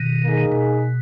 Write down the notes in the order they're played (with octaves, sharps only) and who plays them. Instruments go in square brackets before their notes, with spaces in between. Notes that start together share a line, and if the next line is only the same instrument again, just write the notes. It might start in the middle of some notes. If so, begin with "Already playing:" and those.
Already playing: [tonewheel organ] B2 D#3
[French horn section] A#3 D#4 G#4
[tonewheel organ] B2